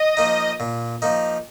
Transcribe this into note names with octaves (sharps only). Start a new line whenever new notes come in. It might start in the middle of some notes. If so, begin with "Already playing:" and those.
Already playing: D#5
F3 A#3 D#4
A#2
F3 A#3 D#4